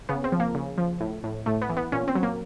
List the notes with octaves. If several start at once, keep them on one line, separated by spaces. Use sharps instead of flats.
C#3 B3
C4
F3
A#3
C#3
F3
A2
A2
A2 A3
B3
E3
B3
A#2 C#4
C4
F#3
A#3